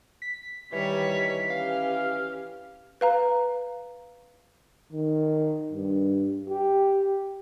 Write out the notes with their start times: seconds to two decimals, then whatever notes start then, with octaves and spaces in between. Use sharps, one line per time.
0.22 B6
0.73 D#3 E3 G3 C#5
1.50 C#4 G4 F5
3.01 B4 F5 A#5
4.92 D#3
5.72 G2
6.49 G4